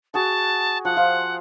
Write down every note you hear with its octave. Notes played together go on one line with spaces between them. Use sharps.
F#4 G#4 F#5 A5
F3 F#5
F4 C5 F5